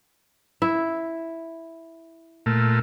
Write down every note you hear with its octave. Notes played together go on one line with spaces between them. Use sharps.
E4
A#2 A3